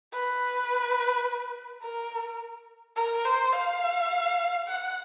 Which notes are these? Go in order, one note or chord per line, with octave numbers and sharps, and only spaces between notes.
B4
A#4
A#4
C5
F5
F#5